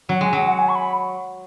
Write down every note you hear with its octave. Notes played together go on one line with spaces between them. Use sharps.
F#3 F#5
G#3 G#5
F#3 F#5
F#5
G#5
C#6
B5